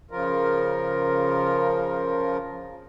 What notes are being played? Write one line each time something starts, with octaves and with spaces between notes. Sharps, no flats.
C#3 F3 F4 A#4